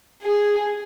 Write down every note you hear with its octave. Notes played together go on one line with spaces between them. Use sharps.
G#4